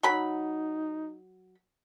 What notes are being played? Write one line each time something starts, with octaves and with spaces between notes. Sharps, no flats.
F#3 D#4 B5